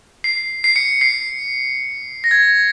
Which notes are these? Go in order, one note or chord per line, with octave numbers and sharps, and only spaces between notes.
C7
C7
C#7
C7
A#6
G#6